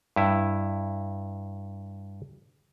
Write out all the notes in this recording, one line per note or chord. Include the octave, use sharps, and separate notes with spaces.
G2 E4